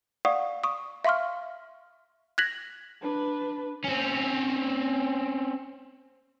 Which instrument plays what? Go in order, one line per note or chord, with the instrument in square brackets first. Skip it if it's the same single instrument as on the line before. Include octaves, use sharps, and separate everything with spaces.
[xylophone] D5 F5 F#5 C#6 D#6
C#6 D#6
E5 F5 C6 C#6 F6
F#6 G#6 A#6 B6 F#7
[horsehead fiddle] D4 B4
[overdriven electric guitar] C4 C#4